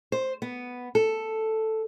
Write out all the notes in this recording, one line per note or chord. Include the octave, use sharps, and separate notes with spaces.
C5
B3
A4